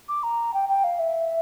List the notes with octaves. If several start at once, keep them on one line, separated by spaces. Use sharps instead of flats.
D6
A#5
G5
G5
F5
E5